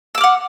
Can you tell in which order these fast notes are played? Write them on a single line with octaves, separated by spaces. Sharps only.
E6 D6 F6 F#5